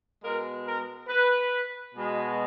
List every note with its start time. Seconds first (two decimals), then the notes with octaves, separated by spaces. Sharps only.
0.23 B2 G#3 A#4
0.66 A#4
1.08 B4
1.95 B2 G#3